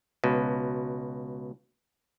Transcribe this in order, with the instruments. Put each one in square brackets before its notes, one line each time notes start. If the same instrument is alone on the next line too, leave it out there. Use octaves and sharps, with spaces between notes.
[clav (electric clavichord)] C#2 B2